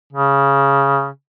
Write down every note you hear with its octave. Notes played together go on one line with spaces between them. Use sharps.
C#3